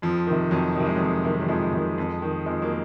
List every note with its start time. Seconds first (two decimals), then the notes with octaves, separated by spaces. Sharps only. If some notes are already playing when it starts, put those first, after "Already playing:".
0.02 F2 F3
0.27 C3 D#3
0.51 F2 F#3
0.76 C3 D#3 F#3
0.86 G#3
0.96 F2 F#3
1.25 C3 D#3
1.41 F#3
1.48 F2 F3 G#3
1.73 C3 D#3
1.98 F2
2.22 D#3
2.46 F2 F3 G#3
2.62 F#3 A#3